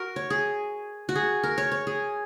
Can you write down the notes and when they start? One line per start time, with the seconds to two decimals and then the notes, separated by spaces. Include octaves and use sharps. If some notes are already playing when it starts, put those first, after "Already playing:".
Already playing: F#4 A#4
0.16 C#5
0.30 G#4
1.09 F#4
1.15 G#4
1.44 A#4
1.58 C#5
1.72 C#5
1.87 G#4